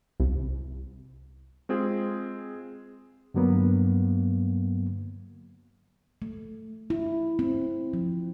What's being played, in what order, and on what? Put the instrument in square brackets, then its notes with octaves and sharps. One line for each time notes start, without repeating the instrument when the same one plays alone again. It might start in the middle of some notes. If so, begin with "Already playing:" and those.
[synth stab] C2
[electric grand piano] G#3 C4 F4 G#4
[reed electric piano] G2 D3 F#3 A#3 B3
[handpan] A3
E4
C4
F3